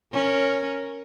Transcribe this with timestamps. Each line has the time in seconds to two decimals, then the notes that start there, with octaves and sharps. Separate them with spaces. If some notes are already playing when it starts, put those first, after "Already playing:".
0.13 C#4 A#4